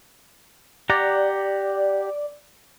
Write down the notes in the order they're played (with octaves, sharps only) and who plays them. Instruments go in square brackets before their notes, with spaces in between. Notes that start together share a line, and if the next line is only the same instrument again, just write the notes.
[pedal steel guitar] G4 F#5 A#5 [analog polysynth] D5